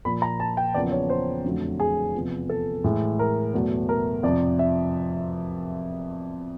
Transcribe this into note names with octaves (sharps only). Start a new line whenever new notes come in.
A#2 F3 A#3 B5
A#5
A5
G5
E2 C#3 F3 A#3 D5
C#5
C5
F2 D3 F#3 A3
G#4
E2 C3 F3
A4
A2 E3 G#3
A#4
E2 B2 F#3 A3
A#4
F2 C3 F3 D5
E5